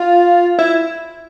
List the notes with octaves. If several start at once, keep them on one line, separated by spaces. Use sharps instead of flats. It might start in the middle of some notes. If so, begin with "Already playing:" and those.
Already playing: F4
E4